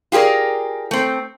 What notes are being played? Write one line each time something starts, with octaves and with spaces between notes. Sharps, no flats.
F4 G4 G#4 A#4 D5
A3 C4